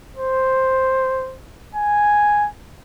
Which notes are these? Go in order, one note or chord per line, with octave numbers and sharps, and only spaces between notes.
C5
G#5